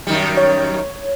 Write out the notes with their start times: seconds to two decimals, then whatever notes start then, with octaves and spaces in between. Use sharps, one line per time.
0.07 F#2 D#3 G3
0.37 C#5